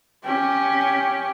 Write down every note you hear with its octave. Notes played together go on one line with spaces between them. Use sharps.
C#4 G4